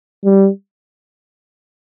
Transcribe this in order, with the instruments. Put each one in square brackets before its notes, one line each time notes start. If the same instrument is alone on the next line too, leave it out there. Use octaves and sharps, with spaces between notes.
[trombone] G3